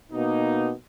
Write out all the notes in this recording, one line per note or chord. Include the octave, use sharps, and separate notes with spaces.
B2 A#3 D#4